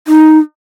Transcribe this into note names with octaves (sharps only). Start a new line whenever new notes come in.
D#4